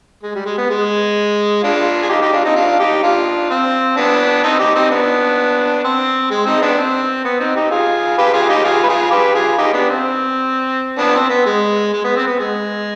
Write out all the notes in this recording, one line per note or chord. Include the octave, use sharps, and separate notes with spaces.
G#3
G3
G#3
B3
G#3
D4 F4
G#4
D#4 G4
D#4 G4
D4 F4
C4 D#4
D4 F4
D#4 G4
D4 F4
C4
B3 D4
C4 D#4
D#4 G4
C4 D#4
B3 D4
C4
G#3
C4 D#4
B3 D4
C4
B3
C4 D#4
D#4 G4
F4 G#4
G4 B4
F4 G#4
D#4 G4
F4 G#4
B4
F4 G#4
G4 B4
F4 G#4
D#4 G4
B3 D4
C4
B3 D4
C4
B3
G#3
G#3
B3
C4
B3
G#3